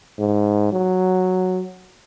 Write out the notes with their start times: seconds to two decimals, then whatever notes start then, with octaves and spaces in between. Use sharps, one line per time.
0.19 G#2
0.72 F#3